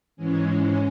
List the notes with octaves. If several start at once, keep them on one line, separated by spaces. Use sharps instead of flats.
G#2 E3 G#3 C#4